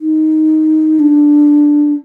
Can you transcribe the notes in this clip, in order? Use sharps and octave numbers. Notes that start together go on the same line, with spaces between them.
D#4
D4